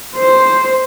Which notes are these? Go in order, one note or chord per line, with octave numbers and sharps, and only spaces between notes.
C5